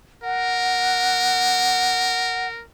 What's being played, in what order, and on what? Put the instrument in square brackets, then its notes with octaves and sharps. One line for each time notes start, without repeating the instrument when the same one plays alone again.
[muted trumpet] A#4 [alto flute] F#5